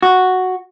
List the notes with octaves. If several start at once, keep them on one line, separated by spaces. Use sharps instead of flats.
F#4